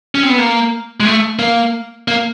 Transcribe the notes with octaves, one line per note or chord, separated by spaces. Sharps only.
C#4
C4
B3
A#3
G#3
A3
A#3
A#3